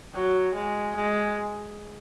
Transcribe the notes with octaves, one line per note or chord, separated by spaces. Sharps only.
F#3
G#3
G#3